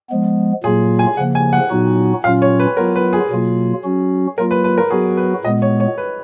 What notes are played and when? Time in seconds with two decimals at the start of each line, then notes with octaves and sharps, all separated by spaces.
0.10 F3 G#3 B3
0.63 A#2 F#3 A#3 F4 G#4
0.99 G#5
1.17 C#3 F3 A#3 F#5
1.35 G#5
1.53 F#5
1.70 A#2 F#3 B3 D#4 F#4
2.24 A#2 F#3 C#4 F4 F5
2.42 C#5
2.60 B4
2.77 F#3 B3 F4 A#4
2.96 B4
3.13 G#4
3.30 B2 F#3 A#3 F4
3.84 F#3 C#4 F#4
4.38 F#3 A#3 F4 A#4
4.51 B4
4.64 B4
4.78 A#4
4.90 F#3 B3 F#4 G#4
5.17 B4
5.44 A#2 G#3 B3 D#5
5.62 C#5
5.80 C#5
5.98 B4